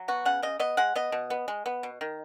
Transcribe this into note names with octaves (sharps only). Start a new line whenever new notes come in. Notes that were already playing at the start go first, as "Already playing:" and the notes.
Already playing: F#3
B3 F#4
C#3 F#5
C#3 D#5
B3 D#5
G#3 F#5
B3 D#5
B2
B3
G#3
B3
B2
D#3